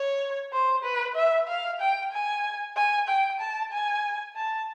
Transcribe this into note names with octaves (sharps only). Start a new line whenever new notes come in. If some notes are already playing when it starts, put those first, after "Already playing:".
Already playing: C#5
C5
B4
E5
F5
G5
G#5
G#5
G5
A5
G#5
A5